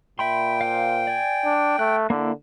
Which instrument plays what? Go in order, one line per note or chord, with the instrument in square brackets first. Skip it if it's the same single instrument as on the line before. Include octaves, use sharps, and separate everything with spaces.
[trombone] A#2 [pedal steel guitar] E5 B5 C6 [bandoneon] G5
[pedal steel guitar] C5 F5
D5 G#5
[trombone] D4
[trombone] A3 [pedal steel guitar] F#6
[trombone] D3 [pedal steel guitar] A#3 E4